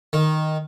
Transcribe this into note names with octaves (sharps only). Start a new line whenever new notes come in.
D#3